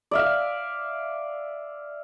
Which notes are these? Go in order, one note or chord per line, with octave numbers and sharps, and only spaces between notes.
D5 E5 F5